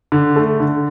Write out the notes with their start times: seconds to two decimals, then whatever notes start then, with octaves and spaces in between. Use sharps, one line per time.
0.12 D3
0.36 A3
0.60 D3